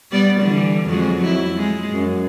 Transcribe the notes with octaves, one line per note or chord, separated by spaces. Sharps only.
G3 B3 D5
D3 E3 G3
F2 F#3 G#3
E4
G#3
F#2